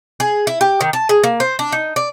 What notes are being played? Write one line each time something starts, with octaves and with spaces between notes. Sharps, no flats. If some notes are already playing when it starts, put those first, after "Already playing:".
G#4
E4
G4
D#3
A5
G#4
A#3
C5
D4
D#4
D5